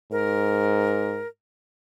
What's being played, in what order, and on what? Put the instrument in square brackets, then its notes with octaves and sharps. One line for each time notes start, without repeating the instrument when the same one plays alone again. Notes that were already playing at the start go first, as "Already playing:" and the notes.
[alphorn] G#2 [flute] A#4